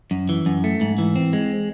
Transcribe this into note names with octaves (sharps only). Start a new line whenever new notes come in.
F#2
E3
F#2
A3
G#2
E3
C4
G#3